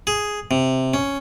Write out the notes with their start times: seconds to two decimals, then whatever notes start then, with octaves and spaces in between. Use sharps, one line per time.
0.07 G#4
0.51 C3
0.94 C#4